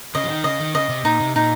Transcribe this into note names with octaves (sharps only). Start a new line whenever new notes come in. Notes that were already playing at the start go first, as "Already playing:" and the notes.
C#3 D#5
F3
D#3
C#3 D#5
D#3
C#3 D#5
C3
A#2 D#4
C3
A#2 D#4